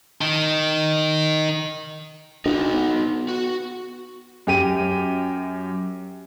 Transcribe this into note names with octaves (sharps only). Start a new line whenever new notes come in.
D#3
D4 D#4 F#4
B3
F#4
F#2 G4 D#7